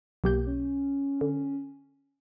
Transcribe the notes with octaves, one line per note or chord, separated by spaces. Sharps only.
B1 A#3 G4 G6
C#4
D3